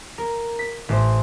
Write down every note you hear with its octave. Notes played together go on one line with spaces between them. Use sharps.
A#4
B6
A1 C5